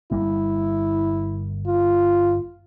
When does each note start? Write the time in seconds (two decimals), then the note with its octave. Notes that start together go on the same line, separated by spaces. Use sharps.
0.12 G1 G3 A#3 E4
1.67 F4